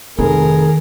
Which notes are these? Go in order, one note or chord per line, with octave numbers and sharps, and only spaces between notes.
F1 D#3 G#4 A#4